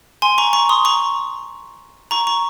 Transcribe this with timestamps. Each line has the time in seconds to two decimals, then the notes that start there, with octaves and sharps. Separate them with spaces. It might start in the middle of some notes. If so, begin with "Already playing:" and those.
0.22 G#5 C6
0.38 A#5 C#6
0.53 A#5 C#6
0.69 C6 D#6
0.85 A#5 C#6
2.11 A#5 C#6
2.27 A#5 C#6